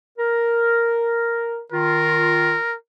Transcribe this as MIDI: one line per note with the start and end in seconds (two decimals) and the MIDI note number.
0.18 1.61 70
1.72 2.55 51
1.72 2.55 65
1.72 2.75 70